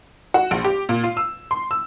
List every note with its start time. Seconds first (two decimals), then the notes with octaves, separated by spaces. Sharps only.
0.34 F#4
0.51 A#1
0.65 G4
0.89 A#2
1.04 F4
1.17 E6
1.51 C6
1.71 E6